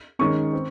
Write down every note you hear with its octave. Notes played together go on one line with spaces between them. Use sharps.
D#3 G#3 C#4 C#6
C4